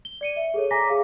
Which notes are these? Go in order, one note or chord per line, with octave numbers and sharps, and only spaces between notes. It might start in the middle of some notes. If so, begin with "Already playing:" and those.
G7
D5 C#7 D#7
E5
G#4 A4 C#5
G#5 A#5 D6 A#6 B6
G#4 F5 A#5